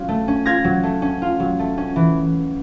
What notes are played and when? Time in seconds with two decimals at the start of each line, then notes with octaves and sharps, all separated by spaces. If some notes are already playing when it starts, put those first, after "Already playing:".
Already playing: F#3 C#4 F4
0.09 A3
0.28 C#4
0.46 F4 G#6 A#6
0.64 F#3
0.83 A3
1.02 C#4
1.22 F4
1.40 F#3
1.59 A3
1.78 C#4
1.96 E3